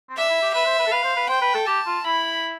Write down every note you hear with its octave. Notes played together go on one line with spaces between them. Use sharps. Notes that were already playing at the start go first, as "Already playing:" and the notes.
C4
D4 E5
E4
G4
B4 E5
C5
B4
A4
B4 F5
C5
B4
C5 G5
B4
A4
G4 A5
F4
E4 B5